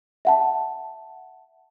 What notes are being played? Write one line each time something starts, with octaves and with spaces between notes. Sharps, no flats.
E5 F#5 A5